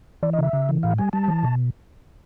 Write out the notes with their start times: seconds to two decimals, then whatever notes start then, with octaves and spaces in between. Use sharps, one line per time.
0.23 E3 D5
0.33 D#5
0.39 C#3 E5
0.53 C#3
0.69 E3
0.83 A2 F5
0.98 G3 G#5
1.13 G3 A5
1.28 E3
1.43 B2